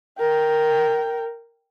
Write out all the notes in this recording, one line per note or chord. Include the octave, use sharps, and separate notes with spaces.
A#4 G5